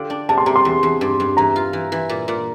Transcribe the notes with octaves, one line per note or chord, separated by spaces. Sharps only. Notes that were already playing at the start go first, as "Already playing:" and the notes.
Already playing: D3 F4 G4 G5
D4
C3 A5
C6
C3 A#5
C6
E2
E2
G2
G2
E3 A#5
F4
E3
E3
A#2
A#2